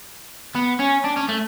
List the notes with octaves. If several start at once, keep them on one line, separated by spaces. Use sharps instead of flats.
B3
C#4
D4
C#4
A3